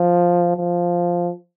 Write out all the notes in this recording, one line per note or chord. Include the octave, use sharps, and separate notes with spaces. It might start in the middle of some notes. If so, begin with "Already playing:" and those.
Already playing: F3
F3